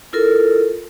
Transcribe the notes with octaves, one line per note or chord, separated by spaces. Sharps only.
E4 F4 A4 A#4